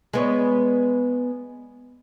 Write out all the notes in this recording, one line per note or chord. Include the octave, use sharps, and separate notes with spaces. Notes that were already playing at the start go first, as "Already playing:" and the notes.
G#3 B3 C#5